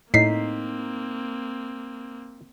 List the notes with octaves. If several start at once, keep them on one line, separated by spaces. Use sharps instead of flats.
A2 A#3 C4 D#4 B6 C7